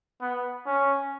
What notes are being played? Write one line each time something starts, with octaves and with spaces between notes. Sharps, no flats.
B3
C#4